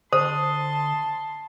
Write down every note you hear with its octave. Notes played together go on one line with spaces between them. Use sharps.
D3 C5 A5 C6 D#6